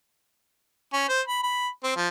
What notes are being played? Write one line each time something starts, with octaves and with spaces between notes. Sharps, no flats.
C#4
C5
B5
B5
C4
F3